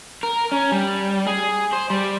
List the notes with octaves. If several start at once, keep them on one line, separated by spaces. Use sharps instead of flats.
A#4
C#4
G3
G#4
C5
G3